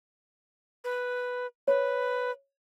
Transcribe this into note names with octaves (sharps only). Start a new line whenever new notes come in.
B4
B4 C#5